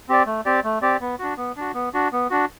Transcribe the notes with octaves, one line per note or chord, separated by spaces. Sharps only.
C4 G4 D5
A3
C4 G4 D5
A3
C4 G4 D5
B3
D4 F#4
B3
D4 F#4
B3
D4 F#4
B3
D4 F#4